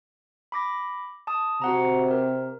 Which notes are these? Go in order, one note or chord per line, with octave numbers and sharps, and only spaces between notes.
B5 D6 A#6
A5 D#6
C3 F#4 F#5 A#5
A#4